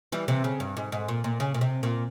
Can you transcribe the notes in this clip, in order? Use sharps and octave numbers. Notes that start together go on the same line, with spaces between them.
E3 G3
C3 E3
C#3
G2
G#2
G#2
A#2
A#2
C#3
A#2
C3
A#2